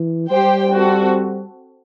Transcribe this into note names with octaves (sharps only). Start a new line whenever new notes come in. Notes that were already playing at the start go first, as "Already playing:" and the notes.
Already playing: E3
G3 G4 C5 G5
C4 F#4 A4